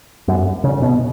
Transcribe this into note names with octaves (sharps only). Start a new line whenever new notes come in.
F#2
C#3
B2